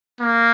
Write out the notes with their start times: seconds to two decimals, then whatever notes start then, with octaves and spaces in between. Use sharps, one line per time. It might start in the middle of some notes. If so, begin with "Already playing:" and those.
0.21 A#3